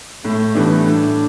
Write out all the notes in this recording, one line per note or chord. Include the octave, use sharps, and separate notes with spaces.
A2 A3
E3 G3 A3 B3 D4
A2 D4